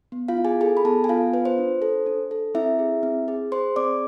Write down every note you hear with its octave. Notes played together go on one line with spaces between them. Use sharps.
B3
F4 F5
E4
G#4 G#5
G#4 A4 G#5
B5
B3 A4 A5
G#5
B3 F4 F5
F4 B4
C5
D4
A4
D4
A4
C4 E4 E5
G#4
C4
G#4
G#4 C5 C6
C4 D5 D6